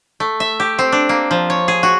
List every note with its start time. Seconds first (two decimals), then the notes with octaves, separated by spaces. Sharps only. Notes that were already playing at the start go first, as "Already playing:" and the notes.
0.20 A3
0.40 E5
0.60 G4
0.79 C4
0.92 D4
1.09 A#3
1.31 F3
1.50 C#5
1.68 G#4
1.83 F#4